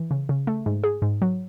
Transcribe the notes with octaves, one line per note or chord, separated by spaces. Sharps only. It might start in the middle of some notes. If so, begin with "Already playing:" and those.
Already playing: E3
C#3
C#3
A3
G#2
G#4
G#2
F#3